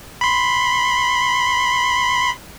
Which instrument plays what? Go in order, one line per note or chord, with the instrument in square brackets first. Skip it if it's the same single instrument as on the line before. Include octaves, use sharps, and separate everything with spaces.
[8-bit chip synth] B5 C6